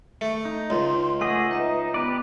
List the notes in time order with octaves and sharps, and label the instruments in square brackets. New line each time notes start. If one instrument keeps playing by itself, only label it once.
[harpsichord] A3
[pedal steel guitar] D#4
[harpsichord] C#2 [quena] C6
[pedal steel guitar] A3 G#4 D#5 [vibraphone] F#5 D6 [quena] D#6
[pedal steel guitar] D#4 [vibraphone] B4 D#5 E5
[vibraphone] B3 [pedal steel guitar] G4 B4 D5